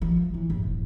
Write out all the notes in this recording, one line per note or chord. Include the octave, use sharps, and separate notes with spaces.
F3
E3
G1
D#1